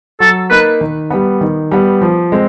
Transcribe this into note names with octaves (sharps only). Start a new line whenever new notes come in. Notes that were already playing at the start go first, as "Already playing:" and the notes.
F#3 A4
A#3 D#4 B4
D#3
G3 B3
D#3
G3 B3
F3
G#3 C4